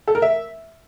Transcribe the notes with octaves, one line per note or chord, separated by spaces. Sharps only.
A4
A#4
E5